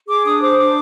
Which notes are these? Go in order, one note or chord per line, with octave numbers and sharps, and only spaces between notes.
G#4 D6
D4 D#6
C5 D6
D4 D6